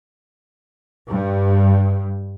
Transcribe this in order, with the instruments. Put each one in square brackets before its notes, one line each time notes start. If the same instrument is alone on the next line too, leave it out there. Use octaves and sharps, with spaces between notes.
[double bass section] G2